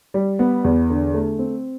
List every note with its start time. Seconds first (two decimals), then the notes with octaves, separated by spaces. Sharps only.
0.14 G3
0.39 B3
0.64 E2
0.89 D3
1.14 A3
1.39 C4